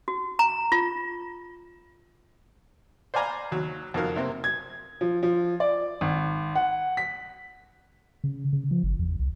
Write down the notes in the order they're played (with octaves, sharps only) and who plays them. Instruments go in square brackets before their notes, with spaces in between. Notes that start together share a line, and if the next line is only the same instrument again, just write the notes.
[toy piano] F#4
A#5
F4
[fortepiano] C5 D5 F5 G#5 A#5 B5
D#2 F#3
F2 D#3 F#3 A#4 F5
C3 A#3 C4
[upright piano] G#6
F3
F3
D5
G#1
F#5
B6
[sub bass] C#3
C#3
F3
G1
E2
C2